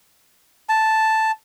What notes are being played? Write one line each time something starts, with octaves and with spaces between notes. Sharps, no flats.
A5